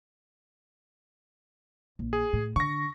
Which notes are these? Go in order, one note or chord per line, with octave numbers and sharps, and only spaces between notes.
A#1
G#4
A2
D3 C#6 A#6